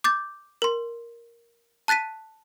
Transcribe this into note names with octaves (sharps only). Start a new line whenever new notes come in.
D6 G6 A6
A#4 C6
A5 F#6 A6 B6 D#7